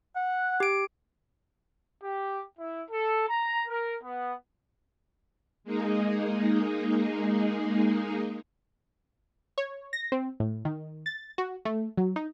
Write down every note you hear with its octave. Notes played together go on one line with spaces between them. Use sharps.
F#5
G4 D7
G4
E4
A4
A#5
A#4
B3
G#3 A#3 D#4 G#4
C#5
A#6
C4
A2
D#3
A6
F#4
A3
F#3
D#4